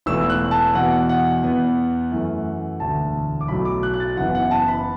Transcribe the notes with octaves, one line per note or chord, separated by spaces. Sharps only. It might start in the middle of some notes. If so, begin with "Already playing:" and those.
E1 E2 E3 A3 E6
F#6
A5
E2 B2 B3 F#5
F#5
E2 E3 B3
F#2 E3 A3
E1 D2 D3 A3 A5
D6
B1 A2 F#3 A3 B5
D6
F#6
F#6
A6
F#1 F#2 E3 B3 F#5
F#5
A5
B5